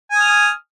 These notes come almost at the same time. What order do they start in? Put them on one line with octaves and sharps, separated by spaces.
G#5 D#6 F6